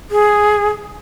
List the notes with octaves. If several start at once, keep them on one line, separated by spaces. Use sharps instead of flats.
G#4